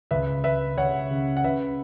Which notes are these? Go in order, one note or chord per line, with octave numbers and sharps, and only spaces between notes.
C#2 B4 E5
C#2 B4 E5
C#2 C#5 F#5
C#3
F#5
C#3 B4 E5